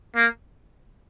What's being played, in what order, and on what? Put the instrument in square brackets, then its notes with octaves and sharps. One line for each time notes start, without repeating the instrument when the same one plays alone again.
[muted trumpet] A#3